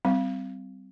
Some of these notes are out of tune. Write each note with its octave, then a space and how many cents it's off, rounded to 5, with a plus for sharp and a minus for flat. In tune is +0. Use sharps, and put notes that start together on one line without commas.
G3 -20 C4 -20